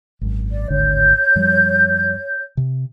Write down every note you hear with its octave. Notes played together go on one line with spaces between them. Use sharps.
G#1 F#2
D5
D1 G#1 D3 C#5 G6
F#2 F3 G3
C3